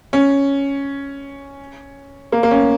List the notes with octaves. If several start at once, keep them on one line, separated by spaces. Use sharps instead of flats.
C#4
A#3
A#3
C#4